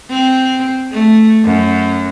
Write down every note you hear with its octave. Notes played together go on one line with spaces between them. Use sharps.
C4
A3
F#2